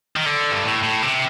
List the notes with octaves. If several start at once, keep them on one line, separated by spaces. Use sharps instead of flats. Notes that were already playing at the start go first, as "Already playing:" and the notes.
D#3
D3
G2
A2
A2
C3